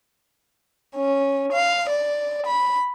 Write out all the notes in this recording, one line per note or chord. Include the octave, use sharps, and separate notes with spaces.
C#4
F5
D5
B5